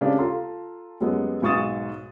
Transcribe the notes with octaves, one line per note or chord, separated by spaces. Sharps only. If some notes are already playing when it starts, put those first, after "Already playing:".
C#3 G#3 C4 D4 G4
F4 A4 A5 A#5 C6
F#2 G3 G#3 B3
B1 G#2 C#6 D#6 A6 E7